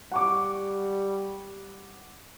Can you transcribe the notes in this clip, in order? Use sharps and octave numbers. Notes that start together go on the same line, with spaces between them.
G3 F#5 C#6 D6